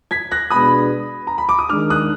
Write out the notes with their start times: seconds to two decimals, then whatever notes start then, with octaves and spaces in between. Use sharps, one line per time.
0.11 G#6 B6
0.31 F#6 A#6
0.51 B2 G#3 B3 D4 B5 D#6
1.27 A#5
1.38 B5
1.49 D6
1.59 D#6
1.69 D#3 G#3 D4 D6 F6
1.90 D#6 F#6